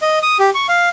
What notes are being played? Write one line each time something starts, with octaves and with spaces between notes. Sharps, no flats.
D#5
D#6
G4
C#6
F5